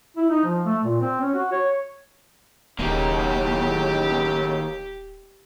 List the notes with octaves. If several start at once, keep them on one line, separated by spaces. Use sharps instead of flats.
E4
D#4
F3
A3
A#2
C4
C#4
F#4
C#5
D#1 D#2 A2 C#3 F#3 A#3 G4